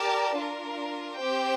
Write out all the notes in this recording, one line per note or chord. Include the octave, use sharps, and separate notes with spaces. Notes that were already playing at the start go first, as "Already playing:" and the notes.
Already playing: G4 A#4 D5 A5
D4 F4 A#4
C4 G4 C5 G5